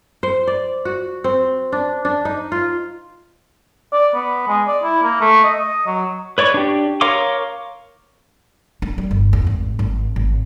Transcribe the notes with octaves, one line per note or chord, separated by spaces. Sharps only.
C5
D5
F#4
C4
D4
D4
D#4
F4
D5
B3
G#3
D5
E4
A#3
A3
D#5
D#5
F#3
B4 C#5 D5 C#6
D4 G4
A#4 C#5 F5 C6 D6
D4
G3
G1
E2
G#1
G#1
G#1